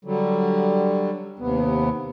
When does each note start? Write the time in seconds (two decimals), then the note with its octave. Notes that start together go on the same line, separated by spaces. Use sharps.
0.05 D3 F#3 G3
1.39 D#2 C3 B3